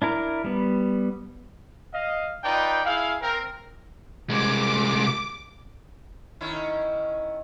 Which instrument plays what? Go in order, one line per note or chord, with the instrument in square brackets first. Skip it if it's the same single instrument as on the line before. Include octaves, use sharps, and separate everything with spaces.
[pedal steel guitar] D4 E4 A#4
G3 B3
[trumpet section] D#5 F5
D#4 F4 B4 D5 G5
E4 G#4 F5
C4 A#4
[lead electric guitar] C2 G#3 [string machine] D6
[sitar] D#3 C#4 E4